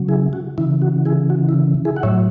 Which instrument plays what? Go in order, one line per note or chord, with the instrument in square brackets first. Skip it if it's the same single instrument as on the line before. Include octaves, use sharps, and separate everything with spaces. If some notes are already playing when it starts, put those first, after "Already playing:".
Already playing: [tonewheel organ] C#3 F#3
E4 G#4
F#4
C#3 E3 E4
F#4
E4 G#4
F#4
E4
E4 G#4
F#5
A2 F#3 C#5 E5